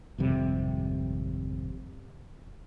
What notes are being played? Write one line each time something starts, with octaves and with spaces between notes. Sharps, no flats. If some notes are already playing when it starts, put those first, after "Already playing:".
G#1 F2 C3 G3